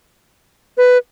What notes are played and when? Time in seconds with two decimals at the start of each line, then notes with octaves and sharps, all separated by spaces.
0.77 B4